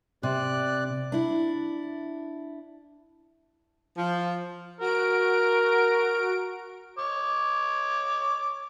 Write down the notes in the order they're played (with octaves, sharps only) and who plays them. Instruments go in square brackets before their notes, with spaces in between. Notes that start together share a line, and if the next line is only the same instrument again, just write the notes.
[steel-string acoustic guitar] C3 [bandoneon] D5 F#6
[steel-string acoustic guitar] D4 E4
[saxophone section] F3
[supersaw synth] F#4 D7 [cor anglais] A#4
[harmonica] C#5 D6